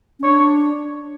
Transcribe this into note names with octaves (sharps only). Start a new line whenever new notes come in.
C#4
D4 C#5